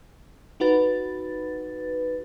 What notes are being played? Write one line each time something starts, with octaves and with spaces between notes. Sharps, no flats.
D#4 F#4 B4 A6